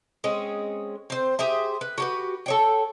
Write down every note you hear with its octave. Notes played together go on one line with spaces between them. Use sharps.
G#3 C4 C#4
C4 C5
G4 G#4 C5 E5
B4
F#4 G4 B4
A4 C#5 G5